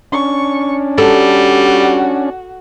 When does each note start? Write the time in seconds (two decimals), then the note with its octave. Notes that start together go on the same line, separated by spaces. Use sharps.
0.12 C#4 D4 C#6
0.98 G3 F#4 A4